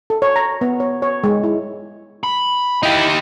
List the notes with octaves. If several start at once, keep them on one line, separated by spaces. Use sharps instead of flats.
A4
C#5
A#5
B3
C#5
C#5
G#3
E4
B5
D#4 E4 G4